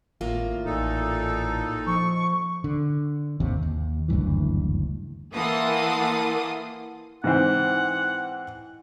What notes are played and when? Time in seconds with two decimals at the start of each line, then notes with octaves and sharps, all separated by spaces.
0.21 G#1 A2 A#3 F4
0.65 A1 A#2 D#4 A4
1.86 F3 C#6
2.64 D3
3.40 G#1 D#2 C3
3.63 D#2
4.08 F#1 D2 G2 E3
5.34 E3 A#3 A4 F#5 C6 D#6
7.24 G#2 E3 C4 F#5